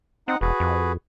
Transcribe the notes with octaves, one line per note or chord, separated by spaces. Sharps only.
C4 D#4 F#5
E1 F#4 G#4 B4
F2